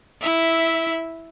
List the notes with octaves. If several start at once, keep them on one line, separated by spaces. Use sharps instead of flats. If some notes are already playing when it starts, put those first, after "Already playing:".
E4 E5